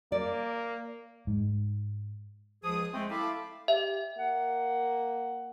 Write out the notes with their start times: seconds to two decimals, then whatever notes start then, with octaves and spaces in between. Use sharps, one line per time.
0.12 A#3 D5
1.27 G#2
2.64 C#2 F3 G#4 D#6
2.93 G#3 A3 C4
3.11 E4 A4 F5 A5 B5 D6
3.68 G4 E5
4.18 A#3 F#5